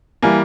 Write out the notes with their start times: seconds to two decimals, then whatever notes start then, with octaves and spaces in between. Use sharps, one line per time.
0.22 E3 G3 A#3 G#5